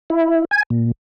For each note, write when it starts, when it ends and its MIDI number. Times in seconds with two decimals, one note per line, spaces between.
0.10 0.45 64
0.51 0.63 80
0.70 0.92 46